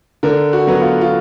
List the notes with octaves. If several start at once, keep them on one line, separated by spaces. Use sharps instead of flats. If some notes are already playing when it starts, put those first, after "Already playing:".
D3 A#4
F#4
F#3 B3
F4
F4